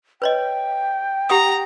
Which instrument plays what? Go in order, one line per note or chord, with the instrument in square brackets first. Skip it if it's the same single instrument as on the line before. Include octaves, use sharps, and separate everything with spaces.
[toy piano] B4 C#5 D#5 [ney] G5
[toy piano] G4 F#5 D#6 [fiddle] A#5